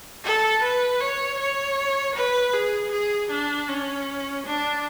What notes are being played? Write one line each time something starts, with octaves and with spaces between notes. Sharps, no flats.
A4
B4
C#5
C#5
B4
G#4
G#4
D4
C#4
D4